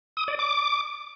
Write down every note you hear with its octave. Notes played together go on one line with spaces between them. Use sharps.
D#6
D5
D6